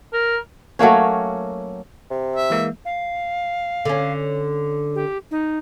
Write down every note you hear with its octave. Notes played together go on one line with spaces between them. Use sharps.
A#4
F#3 A3 A#3 C#4
C3
E5
E3 G#3 A#3
F5
D3 C#4
G4
D#4